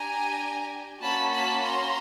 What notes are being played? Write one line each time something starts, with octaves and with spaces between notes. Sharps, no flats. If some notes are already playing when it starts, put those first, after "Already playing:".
Already playing: D4 G4 G#5 A#5
A#3 C#4 F#4 A5 B5
A5 B5
A#5 C6